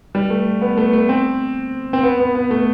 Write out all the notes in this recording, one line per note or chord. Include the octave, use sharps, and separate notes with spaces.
G3
A3
B3
A3
A3
C4
C4
B3
B3
B3
A3